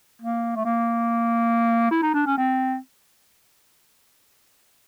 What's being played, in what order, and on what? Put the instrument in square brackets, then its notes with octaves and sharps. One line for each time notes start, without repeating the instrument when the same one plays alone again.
[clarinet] A#3
A3
A#3
E4
D#4
D4
C#4
C4